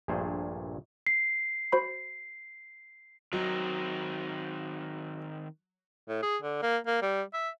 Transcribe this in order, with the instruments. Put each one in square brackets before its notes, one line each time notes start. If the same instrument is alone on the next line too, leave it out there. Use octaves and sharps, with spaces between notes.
[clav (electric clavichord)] A#1 G2 A#2 A3 G#4 C5
[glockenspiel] C7
[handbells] F#4 C5 B5
[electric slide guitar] D#3 C4 D#4 [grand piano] F#3
[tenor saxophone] A2
G#4
D3
A#3
A#3
G3
E5